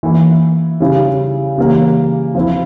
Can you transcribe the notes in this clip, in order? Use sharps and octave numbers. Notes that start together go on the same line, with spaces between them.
E3 A#3 E4
C#3 G3 C#4 E4
C#3 E3 G3 A#3
F3 C4 E4